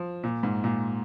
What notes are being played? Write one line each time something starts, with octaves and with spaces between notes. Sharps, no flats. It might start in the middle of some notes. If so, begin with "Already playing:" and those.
Already playing: F3
A#2
G#2
A#2